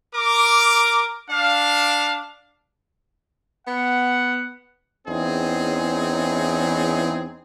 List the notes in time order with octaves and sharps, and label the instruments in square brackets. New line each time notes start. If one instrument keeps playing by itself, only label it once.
[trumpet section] A#4 D6
D4 F5
[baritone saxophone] B3 [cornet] F#5
[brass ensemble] E2 E3 C4 C#4 D#4 G#4